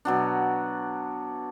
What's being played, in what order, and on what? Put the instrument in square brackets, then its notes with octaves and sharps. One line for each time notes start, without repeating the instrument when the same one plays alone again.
[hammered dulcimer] B2 F#3 D4